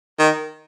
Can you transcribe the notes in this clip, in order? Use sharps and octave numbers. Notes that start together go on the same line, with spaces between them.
D#3